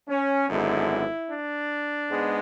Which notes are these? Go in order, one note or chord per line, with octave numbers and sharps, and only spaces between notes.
C#4
G#1 F#2 D3 G#3 B3 E4
D4
G#2 G#3 B3